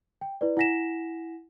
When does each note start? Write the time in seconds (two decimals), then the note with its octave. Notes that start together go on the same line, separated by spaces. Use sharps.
0.21 G5
0.41 E4 B4 D5
0.57 E4 F#5 G#5 A#6 B6 E7